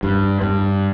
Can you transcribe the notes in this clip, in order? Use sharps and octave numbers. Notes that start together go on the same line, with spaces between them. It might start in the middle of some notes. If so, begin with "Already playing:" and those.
G2
G2